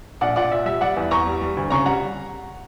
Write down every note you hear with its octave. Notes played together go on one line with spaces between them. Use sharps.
A#1 D5 F#5
A#2 D5 F#5
A#2 E5
G3 E5
G3 D5 F#5
E2
E2 A#5 C#6
G3
G3
D2
C#3 A#5 C#6
G3 F#5 A#5